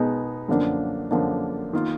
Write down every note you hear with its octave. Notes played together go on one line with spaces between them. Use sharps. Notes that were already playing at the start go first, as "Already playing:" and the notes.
Already playing: B2 G#3 B3 D#4
F#2 D3 F3 A#3 D4
F#2 D3 F3 A#3 D4
D#3 A#3 F4